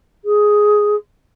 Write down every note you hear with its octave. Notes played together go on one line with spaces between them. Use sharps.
G#4